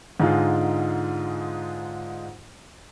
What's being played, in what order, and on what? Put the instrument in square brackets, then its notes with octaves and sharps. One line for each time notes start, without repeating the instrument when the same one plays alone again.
[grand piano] G#2 D3 G#3 D#4 F4